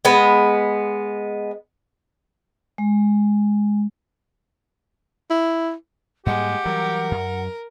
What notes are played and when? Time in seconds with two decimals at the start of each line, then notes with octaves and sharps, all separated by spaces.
0.05 G#3 B3
2.78 G#3
5.30 E4
6.26 G#2 G3 G#3 A#3 G4 F#5
6.65 E3 F#3 G3 A#4
7.11 F#2